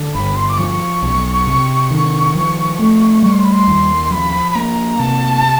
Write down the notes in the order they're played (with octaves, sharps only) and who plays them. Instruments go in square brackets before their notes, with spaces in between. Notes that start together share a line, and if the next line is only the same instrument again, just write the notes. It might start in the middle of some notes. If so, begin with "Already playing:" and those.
Already playing: [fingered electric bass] D3
[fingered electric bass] G1 [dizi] B5
[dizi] C6
D6
[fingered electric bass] F3 [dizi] C#6
[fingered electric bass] B1
C3
D#3
F3
A3
[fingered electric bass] G3 [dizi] C#6
[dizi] C6
B5
C6
[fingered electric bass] D#2
[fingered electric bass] F3 [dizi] B5
[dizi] B5
[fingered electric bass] A#3 [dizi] A#5
[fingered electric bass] C3 [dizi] A5